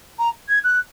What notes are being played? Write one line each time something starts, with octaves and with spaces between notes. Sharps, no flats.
A#5
G#6
F#6